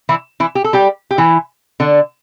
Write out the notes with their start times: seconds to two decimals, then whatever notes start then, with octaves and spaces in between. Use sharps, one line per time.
0.09 E3 E4
0.40 E3 E4
0.55 G4
0.64 A4
0.73 G3 G4
1.11 G4
1.18 E3 E4
1.80 D3 D4